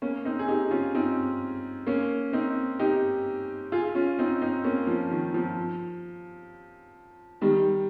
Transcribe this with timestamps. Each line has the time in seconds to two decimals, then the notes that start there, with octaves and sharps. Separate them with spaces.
0.02 A#3 C#4
0.25 C4 D#4
0.39 G#4
0.48 D#4 G4
0.71 C#4 F4
0.95 C4 D#4
1.87 A#3 C#4
2.33 C4 D#4
2.79 D#4 G4
3.72 F4 G#4
3.95 C#4 F4
4.19 C4 D#4
4.42 C4 D#4
4.64 A#3 C#4
4.87 F3
5.11 D#3
5.34 F3
7.41 D#3 G3